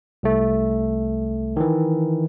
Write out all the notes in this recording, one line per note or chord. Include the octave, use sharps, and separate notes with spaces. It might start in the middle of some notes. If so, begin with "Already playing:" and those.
C2 A3
D#3 E3